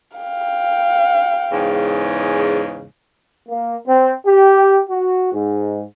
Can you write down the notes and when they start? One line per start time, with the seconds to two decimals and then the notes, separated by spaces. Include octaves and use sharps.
0.17 F5 G5
1.52 E2 G#2 C#3
3.49 A#3
3.86 C4
4.26 G4
4.90 F#4
5.32 G#2